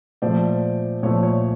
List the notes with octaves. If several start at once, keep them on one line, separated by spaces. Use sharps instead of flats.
A#2 F3 A3 C5 D5
A#2 F3 A3 C#5
C#5